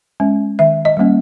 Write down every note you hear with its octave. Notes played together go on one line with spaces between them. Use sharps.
G#3 C#4
D#3 E5
D#5
G3 A#3 C#4